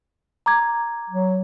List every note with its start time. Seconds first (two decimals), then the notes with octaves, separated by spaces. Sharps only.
0.46 A#5 D6 G#6
1.09 F#3